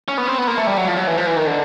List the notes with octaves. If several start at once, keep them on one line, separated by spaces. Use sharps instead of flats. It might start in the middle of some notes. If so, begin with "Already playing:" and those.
C#4
B3
C4
B3
A#3
A3
G3
F#3
F3
F#3
E3
F3
E3
D#3
D3